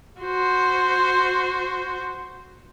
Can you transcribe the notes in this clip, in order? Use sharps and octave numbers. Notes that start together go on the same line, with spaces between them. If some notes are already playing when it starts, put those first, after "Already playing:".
F#4 C5